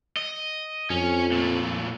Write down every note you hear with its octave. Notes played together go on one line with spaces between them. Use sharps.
D#5
F2 C#4
A#2 A3